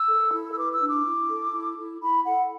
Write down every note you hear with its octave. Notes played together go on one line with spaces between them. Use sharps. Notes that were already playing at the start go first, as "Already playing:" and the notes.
Already playing: E6
A4
E4
E6
B4 D6
E6
D4
D6
E4
A4
E4
E4
E4 B5
A4 F#5